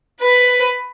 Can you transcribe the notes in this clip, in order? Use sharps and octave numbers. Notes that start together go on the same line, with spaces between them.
B4